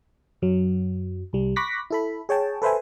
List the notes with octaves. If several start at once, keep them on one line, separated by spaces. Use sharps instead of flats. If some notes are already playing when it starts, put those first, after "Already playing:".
F#2 F#3
C2 G3
B5 C#6 D6 F#6 A#6 B6
E4 A4 B5
G#4 C#5 G5 A5
A4 B4 C5 E5 G#5